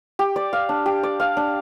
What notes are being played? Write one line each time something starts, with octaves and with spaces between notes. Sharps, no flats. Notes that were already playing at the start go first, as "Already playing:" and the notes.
G4
D5
F5
D4
G4
D5
F5
D4